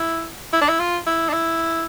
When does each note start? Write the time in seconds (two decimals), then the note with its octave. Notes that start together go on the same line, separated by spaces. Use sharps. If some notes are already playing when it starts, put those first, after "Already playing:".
Already playing: E4
0.53 E4
0.61 D4
0.69 E4
0.79 F4
1.07 E4
1.29 D4
1.33 E4